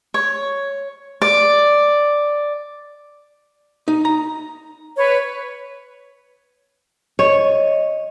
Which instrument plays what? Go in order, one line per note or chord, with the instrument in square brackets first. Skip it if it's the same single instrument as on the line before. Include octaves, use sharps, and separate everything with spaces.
[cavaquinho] C#5
D5
[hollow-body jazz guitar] D#4
A#5
[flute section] B4 C#5
[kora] C#5 [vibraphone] D#5